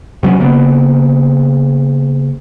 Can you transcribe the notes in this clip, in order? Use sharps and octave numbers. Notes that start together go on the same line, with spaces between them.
C3 F#3 G3 C#4
C#3 A#3 B3